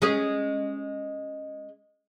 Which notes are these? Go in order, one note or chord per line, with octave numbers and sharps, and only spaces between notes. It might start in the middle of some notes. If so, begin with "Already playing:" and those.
G#3 C#4 G#4